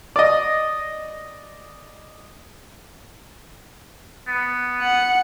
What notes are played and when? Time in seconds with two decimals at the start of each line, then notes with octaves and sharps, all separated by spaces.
0.16 D5 D#5
4.28 B3
4.81 F#5 C#7